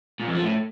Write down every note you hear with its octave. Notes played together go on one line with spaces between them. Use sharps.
A#2
F2
F3
A2